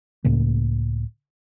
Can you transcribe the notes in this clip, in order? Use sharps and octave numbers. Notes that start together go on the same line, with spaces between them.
C#2 A2 C#3 A#3